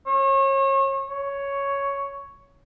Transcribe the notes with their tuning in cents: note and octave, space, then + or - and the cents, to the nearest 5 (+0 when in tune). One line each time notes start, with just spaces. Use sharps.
C#5 -35
C#5 +5